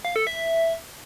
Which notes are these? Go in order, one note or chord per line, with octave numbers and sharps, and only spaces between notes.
F5
A4
E5